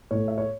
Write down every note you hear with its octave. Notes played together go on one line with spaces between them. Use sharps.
A2 A3 C#5
E5
C#5